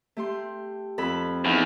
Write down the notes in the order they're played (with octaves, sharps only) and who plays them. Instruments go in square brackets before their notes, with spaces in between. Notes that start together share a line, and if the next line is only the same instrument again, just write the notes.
[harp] A3 G4 C6
F2 A4 B5
[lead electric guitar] E2 [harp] D#4